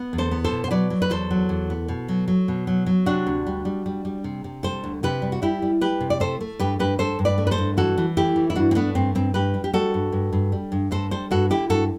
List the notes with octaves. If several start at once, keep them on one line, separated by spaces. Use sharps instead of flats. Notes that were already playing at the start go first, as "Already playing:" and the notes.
Already playing: B3
E2
A4 C5
B3
A4 C5
B2
C5
F#3 B4 D5
F#3
B4
E2 A4 C5
F#3
E2
B3
B2
F#3
F#3
B2
F#3
F#3
C3 D4 F#4
D2
G3
G3
G3
G3
C3
C3
G3 A4 C5
D2
C3 G4 B4
G3
F#4
G3 E4 G4
G3
G3 G4 B4
C3
D5
A3 A4 C5
A3
G2 G4 B4
G2 G4 B4
G2 A4 C5
G2
B4 D5
A3
B4
A4 C5
G2
E3 F#4 A4
E3
A3 E4 G4
E3
E4
G2 D4 F#4
C4
A3 B3 D4
G2 C4
G2 C4
G2 G4 B4
G3
G4
G3 F#4 A4
G2
G2
G2
G3
G2
G2 A4 C5
G3 A4 C5
G2 F#4 A4
D3 E4 G4
G2 F#4 A4